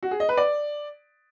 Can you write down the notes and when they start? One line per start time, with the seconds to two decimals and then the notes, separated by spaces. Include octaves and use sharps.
0.03 F#4
0.11 G#4
0.20 D#5
0.29 B4
0.37 D5